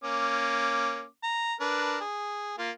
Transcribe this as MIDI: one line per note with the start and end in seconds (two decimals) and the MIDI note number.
0.04 1.05 58
0.04 1.05 61
0.04 1.05 86
1.23 1.54 82
1.60 1.99 62
1.60 1.99 70
1.60 1.99 71
2.00 2.53 68
2.58 2.70 58
2.58 2.70 65